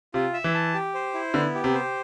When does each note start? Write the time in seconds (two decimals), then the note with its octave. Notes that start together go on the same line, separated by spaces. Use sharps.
0.14 C3 F4
0.34 E5
0.44 E3
0.54 A5
0.74 G4
0.95 C5
1.14 E4
1.34 D3 B3
1.55 G4
1.64 C3
1.74 C5